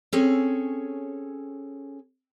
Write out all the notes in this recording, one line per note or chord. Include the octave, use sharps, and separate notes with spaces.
C4 C#4 G#4 A4 C#5